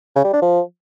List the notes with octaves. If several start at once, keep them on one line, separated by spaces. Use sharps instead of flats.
C#3
G3
D4
F3